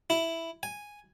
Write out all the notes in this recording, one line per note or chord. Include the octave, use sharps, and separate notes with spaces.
E4
G#5